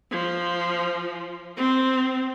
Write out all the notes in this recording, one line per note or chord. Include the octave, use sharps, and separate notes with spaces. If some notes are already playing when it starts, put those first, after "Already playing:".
F3
C4